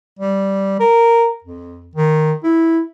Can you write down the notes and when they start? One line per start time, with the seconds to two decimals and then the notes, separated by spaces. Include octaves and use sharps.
0.19 G3
0.80 A#4
1.44 F2
1.95 D#3
2.43 E4